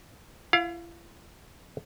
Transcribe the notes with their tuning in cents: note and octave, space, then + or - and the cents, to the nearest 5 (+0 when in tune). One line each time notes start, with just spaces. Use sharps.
E4 +45 F5 +20